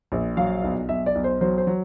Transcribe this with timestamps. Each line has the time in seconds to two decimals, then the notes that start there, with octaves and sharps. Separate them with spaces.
0.12 A#1
0.37 F#3 F5
0.63 B1
0.89 B1 E5
1.06 D5
1.15 B1
1.24 C5
1.41 F#3 C5
1.58 C5
1.67 F#3